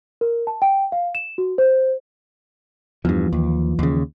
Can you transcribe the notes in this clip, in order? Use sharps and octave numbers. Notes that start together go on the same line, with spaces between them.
A#4
A5
G5
F5
E7
F#4
C5
E2 G2 E3 F3
D#2
D#2 C#3